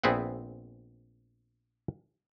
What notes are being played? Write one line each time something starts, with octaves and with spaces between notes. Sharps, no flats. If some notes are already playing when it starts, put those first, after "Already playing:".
A#1 B3 C4 G#4 E5 F#5